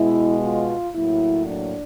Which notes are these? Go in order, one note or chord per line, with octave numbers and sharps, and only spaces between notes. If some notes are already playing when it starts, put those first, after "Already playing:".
Already playing: B2 G#3 B3 E4
F4
A2 F#3 A#3 E4
D4